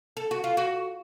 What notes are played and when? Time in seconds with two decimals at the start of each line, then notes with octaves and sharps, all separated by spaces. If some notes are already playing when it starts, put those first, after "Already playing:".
0.17 A4
0.31 F#4
0.44 F4
0.57 F#4